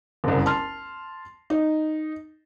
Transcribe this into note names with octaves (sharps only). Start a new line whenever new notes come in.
F#1 C2
A5 C6 F6
D#4